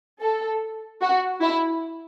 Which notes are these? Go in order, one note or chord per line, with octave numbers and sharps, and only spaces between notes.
A4
F#4
E4